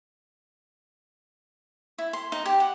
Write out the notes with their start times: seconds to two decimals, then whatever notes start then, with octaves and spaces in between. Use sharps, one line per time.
1.98 E4
2.13 C6
2.32 D#4
2.46 G4
2.60 F#5